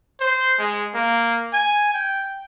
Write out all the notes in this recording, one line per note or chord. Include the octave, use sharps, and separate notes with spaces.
C5
G#3
A#3
G#5
G5